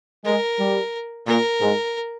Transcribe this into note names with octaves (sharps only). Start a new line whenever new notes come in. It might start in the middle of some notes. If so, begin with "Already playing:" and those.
G#3 A#4
G3
A#2 A#4
G#2